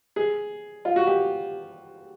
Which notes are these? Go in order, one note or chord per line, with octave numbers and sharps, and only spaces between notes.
G#4
F4
F#4
G4